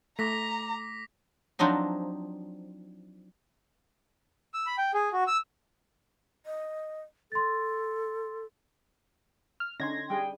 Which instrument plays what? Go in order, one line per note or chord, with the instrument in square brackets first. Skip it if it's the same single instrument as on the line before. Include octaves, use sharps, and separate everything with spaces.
[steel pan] A3 [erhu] A#5 [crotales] D6 A#6 B6
[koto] F3 F#3 C4 D4 D#4
[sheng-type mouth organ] E6
B5
G5
G#4
F#4
E6
[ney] D#5
[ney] A4 [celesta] C6 A6
[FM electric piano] F6
[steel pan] D3 C#4 D#4 [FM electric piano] C6 G#6 A#6
[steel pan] G3 G#4 [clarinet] G5